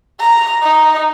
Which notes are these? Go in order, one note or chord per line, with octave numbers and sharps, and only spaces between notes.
A#5
D#4